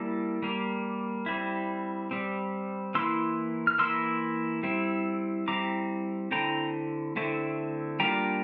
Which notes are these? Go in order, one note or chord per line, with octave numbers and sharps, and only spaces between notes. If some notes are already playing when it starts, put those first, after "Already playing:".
Already playing: G3 A#3 E4 A5
G3 A#3
G3 C4 E4
G3 C4
E3 A#3 E4 C6 E6
F6
E3 A#3 E4 C6 E6
G3 C4 E4
G3 C4 E4 A#5 D6
D3 A3 C4 E4 G5 A#5
D3 A3 C4 E4
G3 A#3 D4 F4 G5 A#5